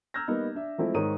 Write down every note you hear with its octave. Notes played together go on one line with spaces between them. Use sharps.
A#5 E6 F6 G6 G#6 A#6
G3 A#3 B3 D#4
D4 E5
F3 G#3 A3 C4 E4
G#2 D#3 A#4 C#5 D#6 D#7